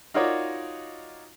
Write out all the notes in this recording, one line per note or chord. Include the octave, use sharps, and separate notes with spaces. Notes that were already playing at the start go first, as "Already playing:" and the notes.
D#4 F4 F#4 A#4 C#5 D5